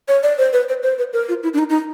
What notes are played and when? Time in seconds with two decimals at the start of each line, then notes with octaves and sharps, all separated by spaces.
0.08 C#5
0.23 D5
0.38 C5
0.53 B4
0.69 C5
0.83 C5
0.98 B4
1.13 A#4
1.29 F4
1.43 E4
1.54 D4
1.58 D#4
1.69 D#4